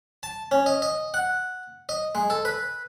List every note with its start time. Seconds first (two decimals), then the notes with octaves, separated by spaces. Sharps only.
0.23 A5
0.51 C#4
0.66 D#5
0.82 D#5
1.14 F#5
1.89 D#5
2.15 G#3
2.30 A4
2.45 B4